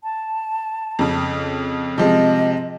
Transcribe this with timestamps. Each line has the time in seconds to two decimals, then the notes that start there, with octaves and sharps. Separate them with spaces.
0.03 A5
0.99 F2 C#3
1.98 C3 F3 G#3 D#5